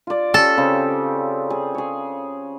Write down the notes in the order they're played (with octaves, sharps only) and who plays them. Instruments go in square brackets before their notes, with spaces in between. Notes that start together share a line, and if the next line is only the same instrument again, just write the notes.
[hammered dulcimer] F4 D5
[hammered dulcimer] C#4 G4 [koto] A4
[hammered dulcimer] C#3 C4
G#4
G#4 C#5